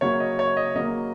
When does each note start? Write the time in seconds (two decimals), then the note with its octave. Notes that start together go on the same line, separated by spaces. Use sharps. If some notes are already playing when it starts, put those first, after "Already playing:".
0.01 C#3 F#3 A#3 C#5
0.20 D#5
0.39 C#5
0.57 D#5
0.75 C#3 F#3 A#3 D#5